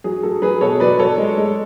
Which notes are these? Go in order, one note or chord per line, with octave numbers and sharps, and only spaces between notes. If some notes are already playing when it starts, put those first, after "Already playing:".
F#3 G#4
F#3 A4
F#3 G#4 B4
B2 A4 C#5
F#3 B4 D5
F#3 A4 C#5
G#3
G#3